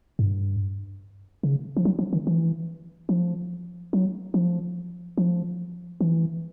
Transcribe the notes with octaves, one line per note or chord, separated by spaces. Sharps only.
G2
C#3
F3
F#3
F3
D#3
E3
F3
F#3
F3
F3
E3